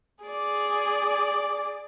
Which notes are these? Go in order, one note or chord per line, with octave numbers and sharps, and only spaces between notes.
G#4 D5